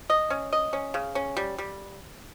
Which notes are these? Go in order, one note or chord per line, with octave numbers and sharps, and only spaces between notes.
D#5
C#4
D#5
C#4
C#3
C#4
G3
G3